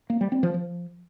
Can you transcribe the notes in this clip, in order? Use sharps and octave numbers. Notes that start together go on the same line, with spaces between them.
A#3
G3
C4
F3
F3